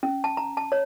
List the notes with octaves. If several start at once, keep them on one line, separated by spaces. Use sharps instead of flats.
C#4
A5
A#5
A5
C#5